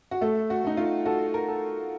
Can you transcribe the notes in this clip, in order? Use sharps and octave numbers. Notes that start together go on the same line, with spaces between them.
F#4
A3 A4
F#4
A3 D#4
F4
F#4 A4
A#4
A4